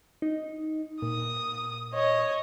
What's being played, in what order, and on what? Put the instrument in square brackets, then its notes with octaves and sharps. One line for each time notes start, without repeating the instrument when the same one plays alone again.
[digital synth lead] D#4
[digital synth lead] A#2 [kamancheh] D#6
[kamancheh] C#5 D#5